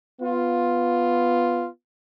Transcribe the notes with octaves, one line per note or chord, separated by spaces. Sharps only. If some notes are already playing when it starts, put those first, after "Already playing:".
B3 F4